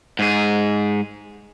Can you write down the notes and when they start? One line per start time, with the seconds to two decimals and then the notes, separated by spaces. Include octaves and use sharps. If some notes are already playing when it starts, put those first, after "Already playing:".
0.19 G#2 G#4